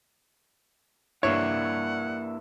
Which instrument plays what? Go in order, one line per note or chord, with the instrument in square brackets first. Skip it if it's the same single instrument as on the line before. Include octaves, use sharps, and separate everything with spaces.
[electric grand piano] G2 E5 [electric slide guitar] A#3 D4 E4 [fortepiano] C#5 [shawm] F#5